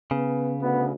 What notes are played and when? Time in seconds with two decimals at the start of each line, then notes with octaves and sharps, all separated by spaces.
0.11 C#3 B3
0.62 D2 B3